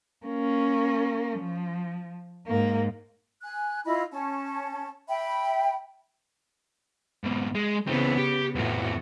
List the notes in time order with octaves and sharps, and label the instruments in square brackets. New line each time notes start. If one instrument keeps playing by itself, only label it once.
[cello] A#3 C#4
F3
G#2 A#3
[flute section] G#5 F#6
E4 F4 D#5 B5
C#4 A5
E5 G5 B5
[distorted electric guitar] G#2 B2
G#3
[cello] C#3 B3 [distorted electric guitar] E3 C4
[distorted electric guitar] G4
[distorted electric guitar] F2 B3 [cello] A2 F#4